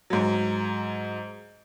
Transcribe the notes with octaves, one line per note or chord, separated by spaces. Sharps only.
G#2 F#3